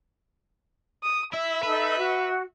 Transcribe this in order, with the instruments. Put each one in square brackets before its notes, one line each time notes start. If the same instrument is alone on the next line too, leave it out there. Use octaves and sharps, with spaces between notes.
[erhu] D#6
[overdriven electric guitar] E4 [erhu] E5
[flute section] D#4 A4 [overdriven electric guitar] B4
[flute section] F#4